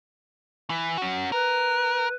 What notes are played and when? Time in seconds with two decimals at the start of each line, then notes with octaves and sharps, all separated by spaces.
0.70 E3
0.98 C#4 F#4
1.32 A#4 B4